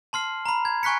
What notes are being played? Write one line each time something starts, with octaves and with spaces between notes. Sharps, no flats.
A5 C6 F6 C7
A#5 B5
G#6
G#5 C#6 F#6 B6 C#7